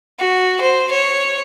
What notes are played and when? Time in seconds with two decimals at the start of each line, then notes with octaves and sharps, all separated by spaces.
0.20 F#4
0.61 C5
0.91 C#5